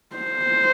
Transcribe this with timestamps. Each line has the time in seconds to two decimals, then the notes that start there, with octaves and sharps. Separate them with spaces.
0.16 C5